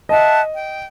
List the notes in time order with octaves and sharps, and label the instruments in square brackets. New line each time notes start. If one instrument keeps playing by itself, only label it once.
[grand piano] D#5 [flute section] E5 F#5 A5
[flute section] G5